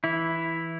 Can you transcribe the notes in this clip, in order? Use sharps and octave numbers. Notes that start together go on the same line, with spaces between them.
E3 E4